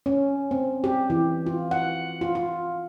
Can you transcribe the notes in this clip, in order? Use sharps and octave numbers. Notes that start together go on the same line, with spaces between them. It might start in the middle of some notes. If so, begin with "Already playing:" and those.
C#4
C4
G4
E3
F4
F#5
F4
F4